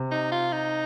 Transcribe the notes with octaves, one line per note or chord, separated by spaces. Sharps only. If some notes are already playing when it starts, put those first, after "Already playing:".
Already playing: C3
D#4
F4
D#4